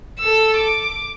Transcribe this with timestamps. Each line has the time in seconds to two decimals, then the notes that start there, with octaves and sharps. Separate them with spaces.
0.20 A4 E6
0.57 D6